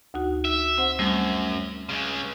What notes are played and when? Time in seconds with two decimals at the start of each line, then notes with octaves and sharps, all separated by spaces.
0.14 D2 D#4 F#4
0.45 E5
0.78 C4 C5 F#5
0.99 F#2 G3 A3 C4
1.89 C#2 C#3